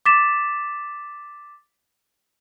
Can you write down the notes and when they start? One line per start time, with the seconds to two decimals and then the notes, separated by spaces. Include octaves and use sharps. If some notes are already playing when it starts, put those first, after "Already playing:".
0.06 D6 A6 B6 E7